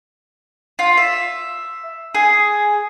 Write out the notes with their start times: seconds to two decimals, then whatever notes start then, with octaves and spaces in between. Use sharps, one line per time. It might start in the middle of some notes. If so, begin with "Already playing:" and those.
0.79 F4
0.97 E5
2.14 G#4